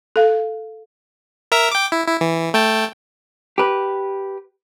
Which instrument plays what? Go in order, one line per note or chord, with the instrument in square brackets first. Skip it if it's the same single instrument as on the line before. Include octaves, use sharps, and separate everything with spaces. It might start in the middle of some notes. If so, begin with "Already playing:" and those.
[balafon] A4 F5
[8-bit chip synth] A#4 E5 A#5
G5 D6
E4
E4
E3
A3 G5 A5
[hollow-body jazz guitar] G4 B4